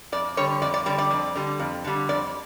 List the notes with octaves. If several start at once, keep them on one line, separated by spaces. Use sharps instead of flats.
F2 D5
D3 G3 C#5
F2 D5
D5
D3 G3 D5
D5
F2
D3 G3
F2
D3 G3
F2 D5